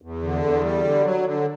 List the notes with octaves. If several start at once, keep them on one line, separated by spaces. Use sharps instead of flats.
E2
D3
E2
G3
D3
F#3
D3